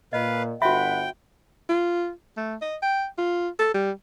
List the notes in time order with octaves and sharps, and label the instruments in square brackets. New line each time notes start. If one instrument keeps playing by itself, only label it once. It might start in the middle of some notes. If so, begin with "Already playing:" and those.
[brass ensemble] A#2 [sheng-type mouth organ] B4 F5 [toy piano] D#5
[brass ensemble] G1 F#5 [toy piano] F#4 E5 [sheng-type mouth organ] G5 [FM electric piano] B5
[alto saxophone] F4
A3
D#5
G5
F4
A4
G3